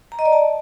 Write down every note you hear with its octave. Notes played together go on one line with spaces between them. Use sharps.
A#5
D#5
D5
A5